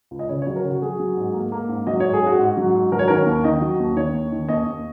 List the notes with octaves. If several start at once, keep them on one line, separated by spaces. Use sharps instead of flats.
C#2
D#5
C#3 C#5
C#5
F#3
A#4
C#3 F#4
F#3 G#4
F#3
G#2
A#3
A#3
G#2
F#3 D#5
G#2 C#5
G#4
G#2 F#4
G#2
F#3
G#2
F#3 A#4
C#5
D#3 A#4
D#2
D#3 D#5
F#3
D#2
D#3 C#5
D#2
D#3
D#2 D#5
D#2